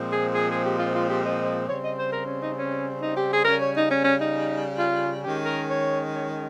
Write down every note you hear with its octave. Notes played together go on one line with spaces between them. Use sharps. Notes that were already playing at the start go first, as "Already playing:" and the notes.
Already playing: A#2 F3 G#3 C4
G#4
G#4
G#4
G4
F4
F4
G4
D#5
C#3 G3 C4 C#5
D#5
C5
A#4
C#4
D#4
C#4
D#4
G4
G#4
C#3 G3 C#4 A#4
C#5
D#4
C#4
C#4
D#4
F4
D#3 G#3 C#4 G4
A#4
C#5
C#5